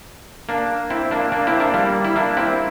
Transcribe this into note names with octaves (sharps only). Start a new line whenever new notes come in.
A#3 D4
C4 E4
A#3 D4
A#3 D4
C4 E4
A#3 D4
G3 A#3
E4
A#3 D4
C4 E4